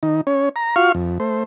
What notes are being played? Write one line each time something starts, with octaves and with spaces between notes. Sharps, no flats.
D#3 D#4
C#4 C#5
A#5
F4 F#4 F5 C#6 F6
F2
A3 C5